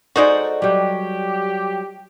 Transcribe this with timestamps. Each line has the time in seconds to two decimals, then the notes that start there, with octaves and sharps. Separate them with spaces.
0.16 G#3 D#4 F#4 A4 C5 D5
0.62 F#3 G3 G4